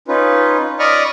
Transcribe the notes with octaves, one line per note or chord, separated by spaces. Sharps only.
C#4 D#4 F4 B4
D5 D#5 B5 C#6 D#6 F6